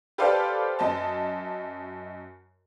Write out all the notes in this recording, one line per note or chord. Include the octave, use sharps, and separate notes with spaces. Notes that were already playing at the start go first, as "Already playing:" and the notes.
G4 A4 B4 C5 D5 F5
F#2 D#5 A5